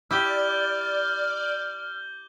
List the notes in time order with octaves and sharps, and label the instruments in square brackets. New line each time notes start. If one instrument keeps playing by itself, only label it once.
[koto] E4 G4 [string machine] D5 [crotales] D6 G6 G7 [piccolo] F6